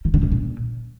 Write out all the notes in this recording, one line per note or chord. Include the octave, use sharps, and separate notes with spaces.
D#3
D3
G2
A#2